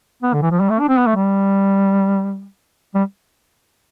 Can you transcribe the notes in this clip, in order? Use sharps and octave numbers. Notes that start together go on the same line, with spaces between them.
B3
D3
E3
F3
G3
A3
D4
C4
B3
A3
G3
G3